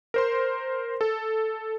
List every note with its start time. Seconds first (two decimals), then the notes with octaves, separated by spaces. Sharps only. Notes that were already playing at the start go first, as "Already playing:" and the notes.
0.14 A#4 C5 C6
1.01 A4